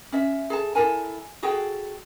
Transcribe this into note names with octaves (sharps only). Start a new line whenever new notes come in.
C#4 E5
G#4 A4 A5
E4 A4 A#4 G#5
F#4 G#4 A4 G5